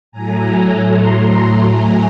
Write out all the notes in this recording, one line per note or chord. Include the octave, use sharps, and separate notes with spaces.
A2 F#3 A3 G#5 A#5
A#5 C6
G#5 A#5